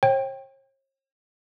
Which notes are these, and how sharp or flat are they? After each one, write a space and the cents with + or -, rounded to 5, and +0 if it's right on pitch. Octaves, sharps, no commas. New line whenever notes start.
C#5 -45 G5 +0